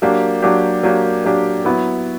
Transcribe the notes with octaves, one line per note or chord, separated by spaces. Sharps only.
F#3 A#3 D4 G4
F#3 A#3 D4 G4
F#3 A#3 D4 G4
F#3 A#3 D4 G4
F#3 B3 E4